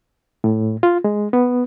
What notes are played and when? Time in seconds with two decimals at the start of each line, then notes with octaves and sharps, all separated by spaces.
0.44 A2
0.83 F4
1.04 G#3
1.33 B3